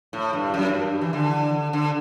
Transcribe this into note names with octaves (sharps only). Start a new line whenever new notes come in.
A2
G2
F#2
G2
E3
D3
D3